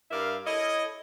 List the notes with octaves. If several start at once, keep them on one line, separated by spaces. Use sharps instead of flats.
G2 A#4 D5 E5 F5
E4 A4 C#5 D#5